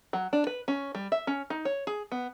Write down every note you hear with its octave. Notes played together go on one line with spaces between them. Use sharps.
F#3
D4
B4
C#4
G3
E5
C#4
D#4
C#5
G#4
B3